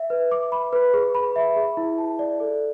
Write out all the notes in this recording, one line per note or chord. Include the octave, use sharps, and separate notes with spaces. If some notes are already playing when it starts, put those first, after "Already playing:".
Already playing: E5
B4
D6
B5
B4
G#4
B5
E5
G#4
E4
A5
D5
A4